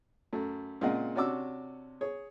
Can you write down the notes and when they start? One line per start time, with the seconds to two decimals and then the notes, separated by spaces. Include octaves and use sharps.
0.33 F#2 A3
0.81 A#2 C#3 G#3 C4 D#5 F#5
1.16 C3 C#4 D4 F#4 D6 E6
2.01 G#4 C#5